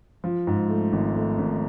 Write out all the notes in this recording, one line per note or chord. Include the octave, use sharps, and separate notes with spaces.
F3
G#2
A3
G#1
A3
G#1